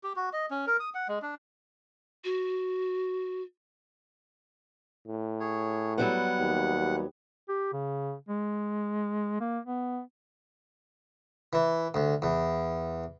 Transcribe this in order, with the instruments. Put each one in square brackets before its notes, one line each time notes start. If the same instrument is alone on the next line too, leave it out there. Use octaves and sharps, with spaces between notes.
[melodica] G4
F#4
D#5
C#4
A#4
D#6
F#5
G#3
D4
[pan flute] F#4
[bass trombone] A2
[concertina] G#4 C#5
[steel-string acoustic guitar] F#3 G3 B3 [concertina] F#5
[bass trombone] D#2
[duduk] G4
C#3
G#3
A#3
B3
[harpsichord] E3
D2
E2